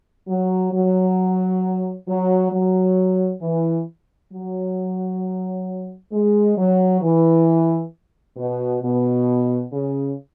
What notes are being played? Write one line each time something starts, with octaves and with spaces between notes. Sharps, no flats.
F#3
F#3
F#3
F#3
E3
F#3
G#3
F#3
E3
B2
B2
C#3